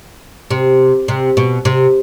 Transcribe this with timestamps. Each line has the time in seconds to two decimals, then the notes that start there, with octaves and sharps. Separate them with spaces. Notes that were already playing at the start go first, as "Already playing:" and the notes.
0.51 C3
1.08 C3
1.37 B2
1.65 C3